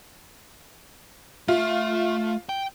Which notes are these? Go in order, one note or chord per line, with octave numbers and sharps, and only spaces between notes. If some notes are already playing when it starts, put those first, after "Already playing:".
A3 F4 E5
G5